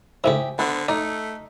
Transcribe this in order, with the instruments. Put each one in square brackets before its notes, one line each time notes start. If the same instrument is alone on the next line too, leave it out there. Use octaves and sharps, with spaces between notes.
[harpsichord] C#2 A2 C3 [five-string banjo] G4 G#4 E5
[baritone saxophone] D3 [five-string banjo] B3 C5
[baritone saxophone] A3 [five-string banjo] D#4 [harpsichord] D5